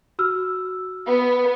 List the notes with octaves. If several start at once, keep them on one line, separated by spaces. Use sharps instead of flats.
F#4 E6 F6
B3